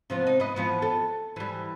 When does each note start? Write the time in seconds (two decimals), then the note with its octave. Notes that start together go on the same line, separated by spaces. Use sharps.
0.10 C3 F3 B3
0.27 D#4
0.40 B4 D#5
0.56 E3 F3 B3
0.82 A4
1.36 E3 G3